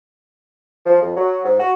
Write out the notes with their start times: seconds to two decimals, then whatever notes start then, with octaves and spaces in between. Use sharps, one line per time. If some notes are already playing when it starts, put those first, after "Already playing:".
0.86 F3
1.02 F2
1.16 F#3
1.45 G#2
1.59 F#4